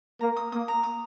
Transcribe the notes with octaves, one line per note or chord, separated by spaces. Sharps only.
A#3 A#5
D#6
A#3 D#6
A#5
D#6